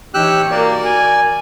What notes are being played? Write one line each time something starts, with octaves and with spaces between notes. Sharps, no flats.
E3 D#4 G4 C#5 E6 F#6
A#3 F#4 A#4 D5
G#5